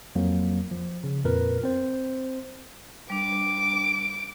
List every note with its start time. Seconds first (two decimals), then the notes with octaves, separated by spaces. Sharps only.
0.15 F2 F#3 A#3
0.71 F3
1.04 C#3
1.24 F2 A#2 A#4 B4
1.63 C4 C5
3.10 G3 D4 D6